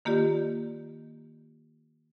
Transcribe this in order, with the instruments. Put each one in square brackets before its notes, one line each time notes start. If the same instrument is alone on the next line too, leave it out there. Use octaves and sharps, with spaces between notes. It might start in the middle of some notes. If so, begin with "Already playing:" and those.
[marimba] D#3 A#3 F4 G4 D5